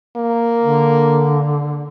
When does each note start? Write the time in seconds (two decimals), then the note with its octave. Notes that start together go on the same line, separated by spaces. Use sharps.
0.17 A#3
0.62 D3